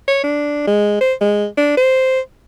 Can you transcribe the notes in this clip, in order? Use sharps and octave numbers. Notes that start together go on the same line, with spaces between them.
C#5
D4
G#3
C5
G#3
D4
C5